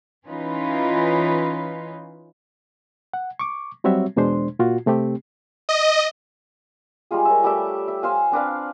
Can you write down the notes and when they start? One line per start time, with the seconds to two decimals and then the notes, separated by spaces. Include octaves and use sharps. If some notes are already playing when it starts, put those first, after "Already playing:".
0.27 E3 C#4 D#4 F4 B4
3.14 F#5
3.39 C#6 D6
3.84 F#3 G3 C4 F#4 C#5 E5
4.16 E2 B2 G#3 D4 C5 C6
4.59 A#2 F4 F#4
4.86 C3 A3 C4 G4
5.69 D#5
7.11 G3 G#3 F4 G#4
7.25 A#4 C#5 E5
7.44 G3 A3 G4 E5
7.88 E5
8.03 C5 F5 G#5
8.32 C4 D4 B4 F5